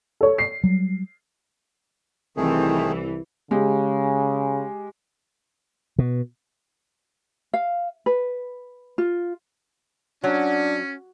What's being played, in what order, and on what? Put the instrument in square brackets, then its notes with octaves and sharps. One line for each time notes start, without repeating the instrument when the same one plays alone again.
[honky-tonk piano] A4 C#5
C7
[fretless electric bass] F#3 G3
[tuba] C2 [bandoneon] D#3 A3 G#4 [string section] E3 [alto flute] C4
[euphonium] C#3 [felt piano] G#3 G4
[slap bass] B2
[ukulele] F5
B4
F4
[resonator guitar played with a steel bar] F#3 [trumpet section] C#4 [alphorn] D4